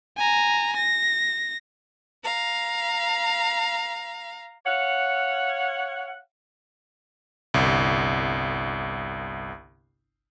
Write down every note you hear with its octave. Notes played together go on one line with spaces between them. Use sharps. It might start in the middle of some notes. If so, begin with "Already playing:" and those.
G#5 A#5
A#6
F5 A#5
C#5 F5 F#5
G1 C2